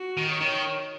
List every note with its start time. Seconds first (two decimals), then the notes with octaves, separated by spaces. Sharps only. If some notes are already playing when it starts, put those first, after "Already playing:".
Already playing: F#4
0.17 D#3
0.29 C#5
0.41 D#3